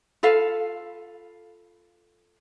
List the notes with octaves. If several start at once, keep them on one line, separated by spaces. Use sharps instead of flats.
F4 A4 B4 F5